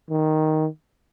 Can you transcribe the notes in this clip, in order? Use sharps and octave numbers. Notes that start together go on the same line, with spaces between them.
D#3